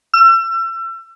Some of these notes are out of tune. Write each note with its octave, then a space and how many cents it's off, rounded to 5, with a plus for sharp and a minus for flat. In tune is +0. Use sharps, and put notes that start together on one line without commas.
E6 +35